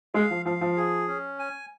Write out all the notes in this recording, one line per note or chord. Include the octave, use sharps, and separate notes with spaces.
G#3 F5
F3
F3 F5
F3
G#4
C#4
G#5